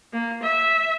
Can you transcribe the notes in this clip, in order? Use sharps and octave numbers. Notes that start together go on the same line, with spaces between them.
A#3
E5